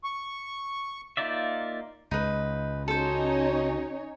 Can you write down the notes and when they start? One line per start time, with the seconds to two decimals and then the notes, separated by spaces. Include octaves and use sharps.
0.04 C#6
1.17 A#3 D#4 F4 D5 E5
2.11 C#2 D#4 B4
2.88 C#4 D#4 F#4 A4 C5 C#5